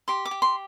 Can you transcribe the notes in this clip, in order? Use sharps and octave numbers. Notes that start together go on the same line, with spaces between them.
G4 C6
D6
G4
C6